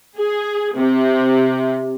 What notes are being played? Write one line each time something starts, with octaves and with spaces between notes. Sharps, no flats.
G#4
C3